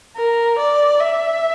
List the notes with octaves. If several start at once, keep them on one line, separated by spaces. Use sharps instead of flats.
A#4
D5
E5